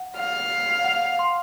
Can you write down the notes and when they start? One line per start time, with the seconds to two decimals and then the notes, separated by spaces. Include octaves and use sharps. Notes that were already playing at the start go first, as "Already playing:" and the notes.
Already playing: F#5
0.18 F5
0.84 F#5
1.19 C6